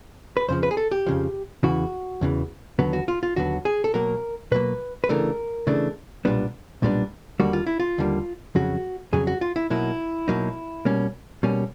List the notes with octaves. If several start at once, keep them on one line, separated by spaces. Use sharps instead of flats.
B4
F2 C#3 F3 C5
B4
G#4
A4
G4
F2 C#3 F3
E2 C#3 E3 F#4
E2 C#3 E3
D#2 D3 F#3 B3
F#4
F4
F4
D#2 D3 F#3 B3 F#4
G#4
A4
B2 F#3 A#3 A#4
B2 F#3 A#3 B4
B4
C#3 E3 A3 D4 A#4
C#3 E3 A3 D4
B1 A#2 G3 B3 D4
B1 A#2 G3 B3 D4
D#2 D3 G3 A#3 F#4
F4
E4
F4
D#2 D3 G3 A#3
F2 C#3 F#3 F#4
F2 C#3 F#3 G#4
F#4
F4
E4
B2 F#3 A#3 D#4 E4
B2 F#3 A#3 D#4
B2 G3 A#3 C#4
B2 G3 A#3 C#4